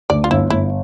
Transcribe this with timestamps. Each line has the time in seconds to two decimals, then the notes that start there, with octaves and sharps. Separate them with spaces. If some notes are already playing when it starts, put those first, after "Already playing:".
0.10 D2 D5
0.24 F4
0.31 G1 E4
0.50 G1 E4